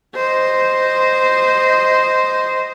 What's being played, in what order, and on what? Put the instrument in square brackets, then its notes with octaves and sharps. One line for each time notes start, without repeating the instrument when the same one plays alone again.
[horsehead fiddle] C5 D#5